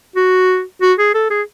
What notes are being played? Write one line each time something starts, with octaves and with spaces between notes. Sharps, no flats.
F#4
F#4
G#4
A4
G#4